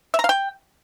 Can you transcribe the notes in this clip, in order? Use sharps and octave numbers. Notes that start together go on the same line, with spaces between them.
E5
A#5
F5
G5